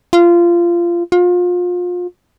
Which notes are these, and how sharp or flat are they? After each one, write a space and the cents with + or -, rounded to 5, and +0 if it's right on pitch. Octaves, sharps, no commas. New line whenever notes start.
F4 -20
F4 +30